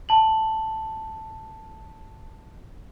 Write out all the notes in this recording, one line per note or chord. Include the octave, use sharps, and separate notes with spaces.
A5 F#7